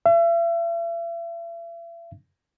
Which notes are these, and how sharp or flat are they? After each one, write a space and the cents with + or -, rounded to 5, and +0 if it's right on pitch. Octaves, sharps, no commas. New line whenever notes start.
E5 +40